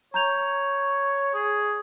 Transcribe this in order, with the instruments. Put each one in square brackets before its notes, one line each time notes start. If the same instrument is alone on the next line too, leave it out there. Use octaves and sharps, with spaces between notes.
[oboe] C#5 [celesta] A#5 G6 F7
[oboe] G#4